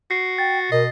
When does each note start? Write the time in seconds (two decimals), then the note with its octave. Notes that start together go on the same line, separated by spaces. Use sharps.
0.11 F#4 C7
0.38 G5 A6
0.72 B2 A#4 D#5